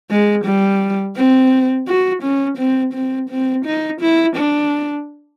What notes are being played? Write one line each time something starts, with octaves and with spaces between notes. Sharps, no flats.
G#3
G3
C4
F#4
C#4
C4
C4
C4
D#4
E4
D4